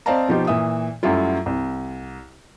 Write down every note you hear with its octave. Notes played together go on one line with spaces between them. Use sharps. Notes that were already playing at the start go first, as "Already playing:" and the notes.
C4 D5 D#5 F5 A5 A#5
B2 F3 D#4 F4 G4
A#2 E3 E5 D#6
F#2 F#3 G3 A3 E4 F4
C2